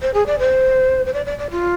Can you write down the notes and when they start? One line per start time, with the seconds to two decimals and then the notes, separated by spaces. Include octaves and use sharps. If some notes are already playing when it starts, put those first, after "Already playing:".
0.02 C5
0.14 G#4
0.26 D5
0.39 C5
1.06 C5
1.14 D5
1.26 D5
1.38 D5
1.51 F4